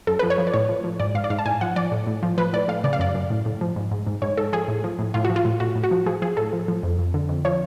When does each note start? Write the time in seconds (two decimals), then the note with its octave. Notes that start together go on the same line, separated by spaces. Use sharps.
0.07 F#2 A4
0.19 F3 B4
0.30 C#5
0.38 F3
0.47 D5
0.54 A2 C#5
0.69 F3
0.84 F3
1.00 G#2 D5
1.15 G#2 F5
1.24 D5
1.30 G#2 F5
1.38 A5
1.46 A2 G#5
1.61 F3 F#5
1.76 F3 D5
1.92 A2
2.07 A2
2.23 F3
2.38 F3 B4
2.53 A2 D5
2.68 A2 F5
2.84 C#3 D5
2.93 F5
2.99 F#2 D5
3.15 F#2
3.30 A2
3.46 A2
3.61 F3
3.76 G#2
3.91 G#2
4.07 G#2
4.22 G#2 C#5
4.37 G#2 A4
4.53 F3 G#4
4.68 A2
4.84 F3
4.99 A2
5.14 A2 F4
5.25 F3 F#4
5.36 F4
5.45 A2
5.60 A2 F#4
5.76 A2
5.83 F#4
5.91 F3
6.06 F3 G#4
6.22 F3 G#4
6.37 A2 A4
6.53 F3
6.68 F3
6.83 F2
6.99 F2
7.14 D3
7.29 F2
7.45 F3 C#5